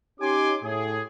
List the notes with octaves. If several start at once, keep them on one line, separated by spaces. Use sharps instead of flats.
C#4 D#4 G4 G#5 C6 D6
A2 G#4